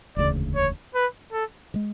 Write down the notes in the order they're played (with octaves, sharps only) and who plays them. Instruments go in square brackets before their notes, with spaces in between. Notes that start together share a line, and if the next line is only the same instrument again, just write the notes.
[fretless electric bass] E1 D2 C#3 [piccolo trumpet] D5
[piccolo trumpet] C#5
B4
A4
[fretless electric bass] C#3 G#3